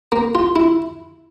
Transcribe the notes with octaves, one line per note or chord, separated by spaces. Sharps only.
A#3
F4
E4